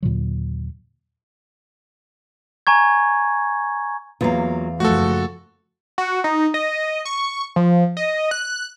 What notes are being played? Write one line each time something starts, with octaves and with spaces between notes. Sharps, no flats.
D#2 A#2 D3 F#3
G#5 A#5 C#6 G#6
E2 F#3 A#3 F4 F5
F#1 F3 A3 F#4 A4
F#4
D#4
D#5
C#6
F3
D#5
F#6